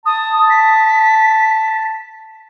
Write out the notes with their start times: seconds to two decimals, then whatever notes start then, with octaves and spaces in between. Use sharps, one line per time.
0.06 A5 D#6
0.50 B6